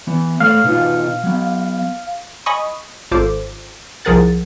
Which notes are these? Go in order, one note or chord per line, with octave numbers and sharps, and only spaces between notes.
E3 B3
A3 C#5 F5
B2 D#4 F4
F#3 B3
D#5 G#5 B5 C#6 D#6
G#1 F4 A4 C5 D6
C2 F3 G#4 A#4 F#5 A6